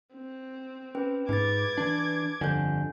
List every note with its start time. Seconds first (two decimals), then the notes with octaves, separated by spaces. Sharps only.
0.14 C4
0.95 C#4 B4 G5
1.29 G#2 B4 D6 G#6 A6
1.78 E3 D4
2.41 G1 F2 D3 G#5 G6